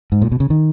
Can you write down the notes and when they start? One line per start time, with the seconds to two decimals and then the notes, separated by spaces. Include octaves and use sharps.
0.12 G#2
0.22 A#2
0.32 B2
0.40 C#3
0.50 D#3